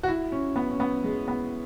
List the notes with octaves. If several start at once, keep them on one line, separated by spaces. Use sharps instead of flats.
F#4
E4
C#4
B3
C#4
B3
G#3
B3